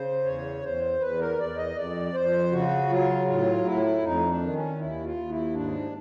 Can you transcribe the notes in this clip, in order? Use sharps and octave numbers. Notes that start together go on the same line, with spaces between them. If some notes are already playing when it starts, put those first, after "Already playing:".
Already playing: C#3 C5
E2 C#5
E2 C5
E2 B4
A#4
E2 D5
D#5
F2 D5
F2 C5
C#3 F#4
F#3 F4
A2 F4
A2 E4
F2 D#4
D4
D#3
C#4
D#2 E4
F4
D#2
E4
G#2 D4